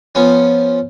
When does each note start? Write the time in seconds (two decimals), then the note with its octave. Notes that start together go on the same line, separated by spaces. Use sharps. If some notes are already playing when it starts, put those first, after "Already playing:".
0.15 F3 B3 C#4